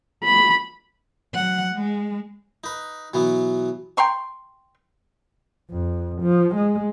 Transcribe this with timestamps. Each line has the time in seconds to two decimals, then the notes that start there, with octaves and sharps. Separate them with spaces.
0.24 B5
1.34 F#3 F#5
1.74 G#3
2.64 D#4 B4
3.14 B2 E3 F#3 B3
3.97 G5 A#5 C6 C#6
5.71 F2
6.22 F3
6.55 G#3